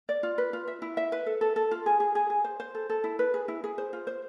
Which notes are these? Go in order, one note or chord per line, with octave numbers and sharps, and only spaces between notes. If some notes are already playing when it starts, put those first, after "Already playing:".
D5
F4
B4
F4
E5
E4
E5
B4
A4
A4
A4
F4
G#4
G#4
G#4
G#4
C5
C5
A4
A4
E4
B4
G#4
E4
G#4
C5
F4
C5